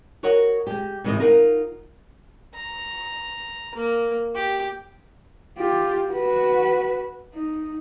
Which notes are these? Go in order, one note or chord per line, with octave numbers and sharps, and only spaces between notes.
F#4 A#4 C#5 D#5 F#5
G#3 G4
G#2 C3 E3 G#3 D#5
D#4 F4 A#4 F5 F#5
A#5
A#3
G4
F4 G4
F#4 B4
D#4